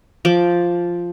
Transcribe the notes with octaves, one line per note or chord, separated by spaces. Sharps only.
F3 D6